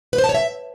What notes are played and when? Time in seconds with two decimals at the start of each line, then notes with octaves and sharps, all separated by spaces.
0.13 B4
0.18 C5
0.24 A5
0.29 C#5
0.34 E5